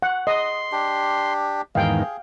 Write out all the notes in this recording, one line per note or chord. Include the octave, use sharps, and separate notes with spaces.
F#5
D#5 C6
D4 G4
E2 G#2 D#3 G#4 F5 G5